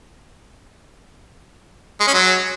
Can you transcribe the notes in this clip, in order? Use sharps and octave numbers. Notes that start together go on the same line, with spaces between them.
G#3
C#4
F#3